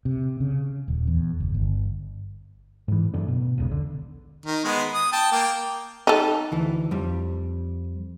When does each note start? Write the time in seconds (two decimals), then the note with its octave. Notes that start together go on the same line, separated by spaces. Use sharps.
0.05 C3
0.40 C#3
0.88 D#1
1.07 E2
1.40 F#1
1.55 G1
2.88 G#2 E3
3.14 F#2 E3 A3 D4
3.28 B2
3.58 E1 B1 C#3
3.71 D3
4.46 D#3
4.65 G#3 B3
4.94 D#6
5.13 G5 A5
5.32 A#3 G5
6.07 D#4 G4 A4
6.52 D2 E3
6.91 F2 G3